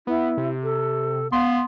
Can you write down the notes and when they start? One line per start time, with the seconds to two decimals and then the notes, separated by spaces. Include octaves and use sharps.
0.07 B3 E4
0.37 C3
0.63 A4
1.32 B3 F5 C6